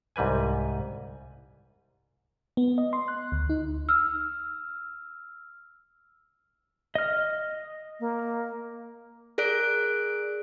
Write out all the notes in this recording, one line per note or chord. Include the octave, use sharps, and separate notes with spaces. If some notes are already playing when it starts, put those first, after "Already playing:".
C2 G#2 G3 B4 G#5
B3
D#5
C6
F#6
D2
D#4
E6 F6
D#5 F6
A#3
G#4 A#4 D5 F#6 D7